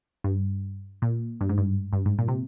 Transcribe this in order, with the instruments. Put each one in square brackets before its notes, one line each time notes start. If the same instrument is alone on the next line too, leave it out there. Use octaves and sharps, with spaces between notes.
[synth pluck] G2
A#2
G2
G#2
G2
G2
G#2
A#2
C3